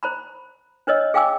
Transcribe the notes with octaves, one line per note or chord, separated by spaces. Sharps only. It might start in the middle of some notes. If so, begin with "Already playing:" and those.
C5 A#5 B5
D4 B4 C#5 D#5 E6
G#4 F5 G5 G#5 D6 E6